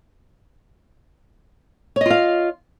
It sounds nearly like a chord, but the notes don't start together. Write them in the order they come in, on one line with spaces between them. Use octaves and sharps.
C#5 D#5 F4 F5